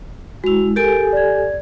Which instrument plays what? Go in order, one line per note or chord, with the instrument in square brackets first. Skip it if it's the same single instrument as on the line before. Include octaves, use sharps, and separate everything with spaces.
[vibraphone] G#3 E4 [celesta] F#4 F7
[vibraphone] G4 A4 G#5 [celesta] A#4 D7
[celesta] D5 G#6